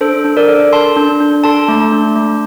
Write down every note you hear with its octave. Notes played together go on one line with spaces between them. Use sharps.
D4 A4 C5
D4
A#4 D5
A4
A4 A5 C6
D4
D4
A4 A5 C6
A3
D4
A3